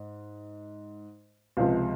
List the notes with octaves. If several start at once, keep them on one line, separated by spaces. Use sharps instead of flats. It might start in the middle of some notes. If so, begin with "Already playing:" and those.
Already playing: G#2
C#2 C3 F3 G#3 F5